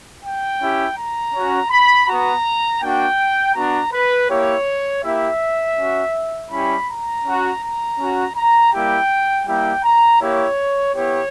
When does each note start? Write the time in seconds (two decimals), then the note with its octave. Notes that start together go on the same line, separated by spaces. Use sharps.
0.23 G5
0.60 C#4 E4 G4
0.97 A#5
1.33 C#4 F#4
1.70 B5
2.07 B3 F#4 A#5
2.81 A#3 D4 F#4 G5
3.55 B3 D4 F#4 A#5
3.92 B4
4.29 A#3 E4 G4 C#5
5.03 A#3 E4 G4 E5
5.77 C#4 F#4
6.50 G3 C#4 E4 G4 B5
6.88 A#5
7.25 C#4 F#4
7.61 A#5
7.99 C#4 F#4
8.35 A#5
8.72 G3 A#3 E4 G4 G5
9.46 G3 A#3 E4 G4 G5
9.83 A#5
10.20 A#3 E4 G4 C#5
10.94 B3 E4 G4 C#5